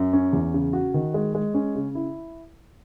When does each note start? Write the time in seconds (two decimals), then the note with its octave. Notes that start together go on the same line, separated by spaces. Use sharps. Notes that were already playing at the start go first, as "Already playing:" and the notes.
Already playing: F#2
0.13 C#4
0.33 E2
0.54 C#3
0.73 F#4
0.94 D#3
1.14 G#3
1.35 G#3
1.54 C#4
1.75 C#3
1.95 E4